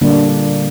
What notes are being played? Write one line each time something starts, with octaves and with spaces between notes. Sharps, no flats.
A#2 D3 G3 A#3 D4